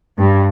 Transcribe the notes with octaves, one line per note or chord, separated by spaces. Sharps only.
G2